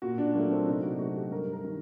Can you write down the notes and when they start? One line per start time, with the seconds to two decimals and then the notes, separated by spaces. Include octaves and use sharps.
0.02 A#2 F#4
0.18 D4
0.34 F#3 A3 A#3
0.51 C4
0.67 C3 D#4
0.83 F#4
0.99 F#3 A3 F#4
1.16 G4
1.31 G2 A#4
1.53 A#4
1.64 D#3